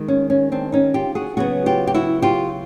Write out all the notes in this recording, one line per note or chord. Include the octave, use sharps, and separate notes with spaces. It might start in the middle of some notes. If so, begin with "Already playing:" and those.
Already playing: D#3 G#3
C#4
C#4
C4 D4
C#4 D#4
F4 G4
F#4 G#4
C#3 F#3 B3 F#4 G#4
F4 G4
G4
E4 F#4
F4 G4